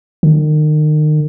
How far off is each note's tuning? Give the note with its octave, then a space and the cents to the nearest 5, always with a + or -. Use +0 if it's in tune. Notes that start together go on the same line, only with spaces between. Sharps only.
D#3 -35